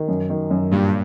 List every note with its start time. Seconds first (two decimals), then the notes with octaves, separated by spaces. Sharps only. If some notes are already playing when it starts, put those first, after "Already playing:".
Already playing: D#3
0.08 F#2
0.30 D#3
0.50 F#2
0.71 G2 A#2